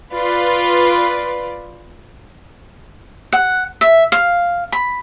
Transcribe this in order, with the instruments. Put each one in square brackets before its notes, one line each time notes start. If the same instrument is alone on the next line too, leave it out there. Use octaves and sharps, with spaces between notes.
[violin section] F4 B4 D5
[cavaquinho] F#5
E5
F5
B5